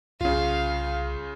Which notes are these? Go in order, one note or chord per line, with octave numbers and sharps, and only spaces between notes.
C2 C#3 F4 F5